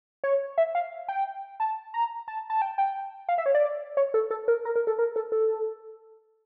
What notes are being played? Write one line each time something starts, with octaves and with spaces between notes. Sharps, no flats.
C#5
E5
F5
G5
A5
A#5
A5
A5
G5
G5
F5
E5
C#5
D5
C#5
A4
A4
A#4
A#4
A#4
A4
A#4
A4
A4